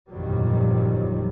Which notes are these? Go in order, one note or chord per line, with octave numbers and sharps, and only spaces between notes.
G1 F2 A#2 D#3 F#3 G3